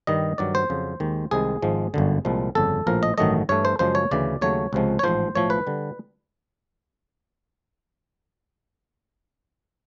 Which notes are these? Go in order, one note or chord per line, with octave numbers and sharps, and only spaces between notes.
G2 D#3 G3 D#5
G2 D#3 F#3 D5
C5
F2 C#3 F#3
D#2 D#3 G#3
C2 C3 D#3 G#3 G#4
G#1 G#2 F3 G#3
G1 F#2 D3
C2 A#2 F3 G#3
G1 F2 C#3 A4
A#1 A2 F3 A#4
D#5
A1 G2 D#3 F#3 A3 D#5
G2 E3 A3 C#5
C5
F#2 C#3 F3 G#3 C5
C#5
D2 C#3 E3 D5
D#2 C#3 F#3 A3 C#5
C#2 C3 F3 G#3
C#5
A1 G#2 F3 C5
B1 A2 F3 A3 C#5
B4
D3 G3